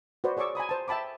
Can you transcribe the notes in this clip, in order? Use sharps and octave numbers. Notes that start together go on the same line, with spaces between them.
F#4 B4 C5 D5
G#4 C#5 D5 C#6 D6 E6
G#5 A#5 B5 D#6
C5 A5
E5 G5 A5 B5 D6